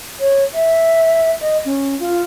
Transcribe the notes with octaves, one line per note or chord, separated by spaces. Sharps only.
C#5
E5
D#5
C#4
F4